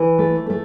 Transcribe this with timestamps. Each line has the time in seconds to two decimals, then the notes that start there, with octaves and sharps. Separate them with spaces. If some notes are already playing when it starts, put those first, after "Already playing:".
Already playing: E3
0.19 A3
0.50 A3